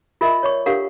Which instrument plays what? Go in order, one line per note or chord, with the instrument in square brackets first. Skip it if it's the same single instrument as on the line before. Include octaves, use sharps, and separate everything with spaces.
[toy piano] F4 A#4 D#5 E5
C#5 D5 C#6
D4 G4 A4 A#4 F5 F#5